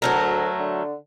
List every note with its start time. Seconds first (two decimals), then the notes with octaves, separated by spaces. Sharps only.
0.02 D2 F#3 A3 A#4
0.59 D3